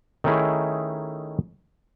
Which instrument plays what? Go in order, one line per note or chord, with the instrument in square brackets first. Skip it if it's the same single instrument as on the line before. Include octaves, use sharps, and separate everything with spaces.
[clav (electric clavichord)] D#3 A3 C#4 D#4 E4 G#4